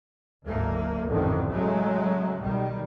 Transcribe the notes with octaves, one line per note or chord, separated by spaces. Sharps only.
F#1 D2 G#2 A3 A#3
A1 F2 G#2 D3 D#3
C#3 F#3 G#3 A3
B1 D#3 G3